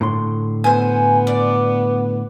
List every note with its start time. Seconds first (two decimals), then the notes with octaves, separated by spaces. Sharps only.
0.01 A2 D3 C6
0.64 B3 C5 G#5
1.27 D5